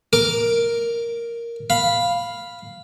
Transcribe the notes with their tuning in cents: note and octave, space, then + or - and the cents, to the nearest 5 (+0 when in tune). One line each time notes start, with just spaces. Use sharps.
A#4 +0 D6 +0
F5 +0 B5 +0